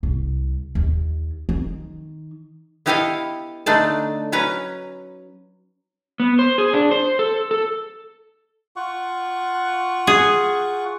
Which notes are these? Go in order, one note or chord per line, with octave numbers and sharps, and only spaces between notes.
C2
D#2
D#3
B3 E4 G4 A4 D#5 F5
D3 A3 D4 D#4 D5 A5
F#3 C#4 B4 A#5
B3
C5
G#4
D4
C5
A4
A4
F4 F#5 C#6
G#4